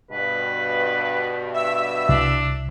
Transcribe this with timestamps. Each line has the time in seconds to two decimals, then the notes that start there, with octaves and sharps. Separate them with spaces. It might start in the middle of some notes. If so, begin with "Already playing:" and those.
0.11 G2 B2 B4
1.54 E5 E6
2.09 C2 D4